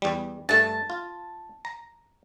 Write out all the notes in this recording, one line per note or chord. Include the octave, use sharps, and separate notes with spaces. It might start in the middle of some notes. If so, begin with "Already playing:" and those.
E2 G3
G2 A3 A5
F4
A#5